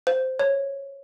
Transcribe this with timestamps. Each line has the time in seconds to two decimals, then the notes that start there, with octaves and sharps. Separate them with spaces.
0.07 C5
0.39 C#5